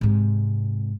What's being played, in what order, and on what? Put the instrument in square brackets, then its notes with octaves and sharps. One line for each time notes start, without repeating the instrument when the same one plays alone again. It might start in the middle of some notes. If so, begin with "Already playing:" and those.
[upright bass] G#2 C3